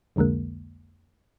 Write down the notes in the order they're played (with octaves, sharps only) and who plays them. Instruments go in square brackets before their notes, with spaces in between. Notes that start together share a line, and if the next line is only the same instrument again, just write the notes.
[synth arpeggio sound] C2 F2 D3 G#3 A#3